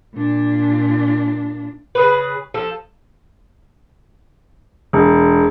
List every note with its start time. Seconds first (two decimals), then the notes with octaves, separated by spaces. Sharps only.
0.15 A#2 D4
1.95 C#3 G#4 B4
2.54 F3 A4
4.93 E1